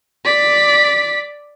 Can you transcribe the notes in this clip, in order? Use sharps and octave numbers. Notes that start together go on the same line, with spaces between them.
D5 B6